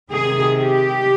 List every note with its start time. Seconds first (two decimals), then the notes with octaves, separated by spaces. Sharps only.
0.10 C3 D#3 G#4
0.58 G4